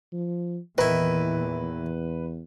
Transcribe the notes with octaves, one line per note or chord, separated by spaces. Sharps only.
F3
E2 A#2 D#3 E3 E4 B4